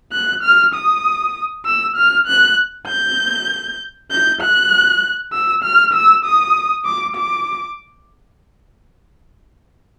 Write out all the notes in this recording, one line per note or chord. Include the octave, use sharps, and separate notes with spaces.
F#6
F6
D#6
E6
F6
F#6
G6
G6
F#6
E6
F6
E6
D#6
D6
D6